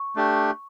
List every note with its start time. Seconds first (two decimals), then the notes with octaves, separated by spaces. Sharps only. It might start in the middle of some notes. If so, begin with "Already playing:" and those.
Already playing: C#6
0.16 A3 D4 G4